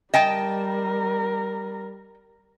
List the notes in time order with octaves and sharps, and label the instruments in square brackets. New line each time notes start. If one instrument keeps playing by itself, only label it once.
[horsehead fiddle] G3 A#4 [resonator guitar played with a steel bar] D#5 G5 A5